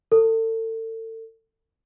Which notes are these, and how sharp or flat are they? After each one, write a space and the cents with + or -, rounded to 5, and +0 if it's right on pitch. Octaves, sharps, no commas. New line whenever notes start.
A4 +35